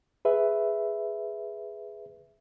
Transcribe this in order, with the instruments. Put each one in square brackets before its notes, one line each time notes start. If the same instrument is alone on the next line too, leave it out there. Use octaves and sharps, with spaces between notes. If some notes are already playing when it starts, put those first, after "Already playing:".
[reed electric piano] G#4 B4 E5